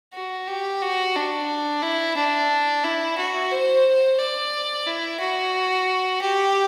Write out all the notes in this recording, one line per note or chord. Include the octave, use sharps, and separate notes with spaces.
F#4
G4
F#4
D4
E4
D4
E4
F#4
C5
D5
E4
F#4
G4